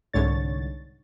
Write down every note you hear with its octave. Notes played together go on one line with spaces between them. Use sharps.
C2 G#2 D3 C#5 A6